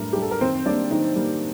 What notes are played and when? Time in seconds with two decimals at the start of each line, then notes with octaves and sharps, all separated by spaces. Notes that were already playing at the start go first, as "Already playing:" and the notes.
Already playing: A2 G3 D4 A#4
0.13 G3 D4 G4
0.22 A4
0.31 A#4
0.41 D#3 C4 C5
0.65 G3 A#3 D4 D5
0.90 D#3 D#4
1.16 G3 A#3